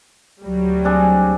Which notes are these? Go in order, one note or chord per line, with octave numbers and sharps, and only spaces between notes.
D2 F#3 G3
C4 D4 G#4